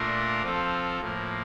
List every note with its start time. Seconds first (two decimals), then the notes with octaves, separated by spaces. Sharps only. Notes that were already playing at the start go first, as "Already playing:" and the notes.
Already playing: A#2 A3 D4 F4 A#4
0.42 F3 C4 F4 A4
1.00 A2 F3 A#3